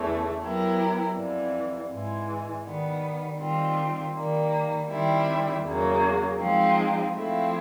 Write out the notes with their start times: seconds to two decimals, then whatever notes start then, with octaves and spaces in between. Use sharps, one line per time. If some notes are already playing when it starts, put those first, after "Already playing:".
Already playing: E2 C#3 E3 A3
0.41 F#3 B3 E4 G4 A#4
1.16 F2 C3 E3 G3
1.91 G#2 E3 G#3
2.65 D#3 G3 B3
3.39 D#3 G3 C4 F4
4.14 D#3 G3 A#3
4.90 D#3 G3 C4 E4
5.63 E2 C#3 F#3 A#3
6.38 F3 G#3 C4 D#4
7.12 F3 A3 C4 E4